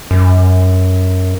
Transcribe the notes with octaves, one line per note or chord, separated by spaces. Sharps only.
F#2